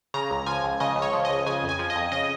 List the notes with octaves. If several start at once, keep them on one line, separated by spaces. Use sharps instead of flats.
C#3 A#5
C#2
F3 G#5
C#2
C#3 D#5
C#2
C#5
F3
C#2 D#5
C#3 G#5
F2
G#5
F3
D#5
F2
C#3 D#5